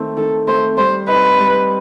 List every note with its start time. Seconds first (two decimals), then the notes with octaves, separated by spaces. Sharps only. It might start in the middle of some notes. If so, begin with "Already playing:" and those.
Already playing: D#3 A3 C4
0.17 D#3 A4
0.48 A3 C4 C5
0.78 G3 C5
1.08 C4 D#4 B4
1.39 G3